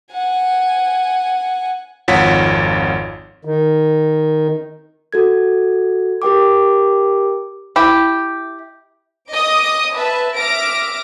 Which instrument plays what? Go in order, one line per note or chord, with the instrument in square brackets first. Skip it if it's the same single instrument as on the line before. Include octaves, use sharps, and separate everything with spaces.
[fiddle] F#5 G#5
[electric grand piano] G#1 F2 F4 C#5 F#5 B6
[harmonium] D#3
[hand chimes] F#4 A4 G#6
G4 A#4 G5 D6
[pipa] E4 G4
[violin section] D#5 D6 D#6
B4 E5 A5
E5 D6 F6 A#6 D7